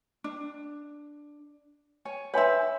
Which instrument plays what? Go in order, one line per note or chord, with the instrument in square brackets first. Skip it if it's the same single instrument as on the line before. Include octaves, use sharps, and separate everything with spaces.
[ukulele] D4
C#5 G#5
[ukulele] B4 E5 [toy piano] C#5 G#5 C6